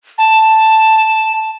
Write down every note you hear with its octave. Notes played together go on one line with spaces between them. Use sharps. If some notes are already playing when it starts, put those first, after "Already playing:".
A5